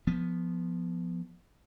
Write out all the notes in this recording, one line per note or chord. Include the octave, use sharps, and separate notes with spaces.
F3 B3